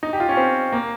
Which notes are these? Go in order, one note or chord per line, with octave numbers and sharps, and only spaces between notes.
D#4
G4
F4
C#4
C4
A#3